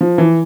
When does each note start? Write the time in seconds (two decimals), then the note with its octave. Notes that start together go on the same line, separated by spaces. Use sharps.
0.01 F3
0.18 E3